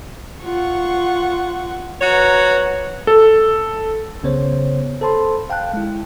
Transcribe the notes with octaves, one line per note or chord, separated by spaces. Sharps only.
F4 F#5 C#6
F#4 B4 C#5 A#5
A4
B1 C#3 B3 C5 C#5
A4 C5 A5 B5 C6
F5 G5 A5 F#6
G#3 E4